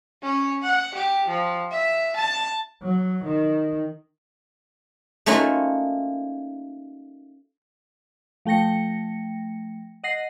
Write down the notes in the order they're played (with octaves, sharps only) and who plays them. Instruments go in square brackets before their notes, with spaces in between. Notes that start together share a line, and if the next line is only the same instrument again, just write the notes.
[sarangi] C#4
F#5
G4
F3
E5
A5
[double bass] F#3
D#3
[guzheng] A3 A#3 C#4 D#4 F4 F#4
[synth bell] F3 A3 G5 A#6 C#7
D#5 F#5 A#6 C7